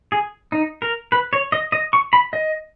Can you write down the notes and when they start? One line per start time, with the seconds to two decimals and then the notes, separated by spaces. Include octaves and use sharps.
0.12 G#4
0.52 D#4
0.82 A#4
1.12 B4
1.33 C#5
1.52 D#5
1.72 D#5
1.93 C#6
2.13 B5
2.33 D#5